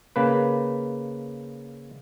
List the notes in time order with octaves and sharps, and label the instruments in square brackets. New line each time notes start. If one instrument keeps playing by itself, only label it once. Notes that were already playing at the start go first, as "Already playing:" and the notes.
[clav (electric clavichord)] C#3 A#3 B4